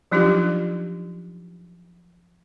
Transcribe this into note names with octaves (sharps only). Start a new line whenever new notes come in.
F3 F#3 D4 D#4 F4 G4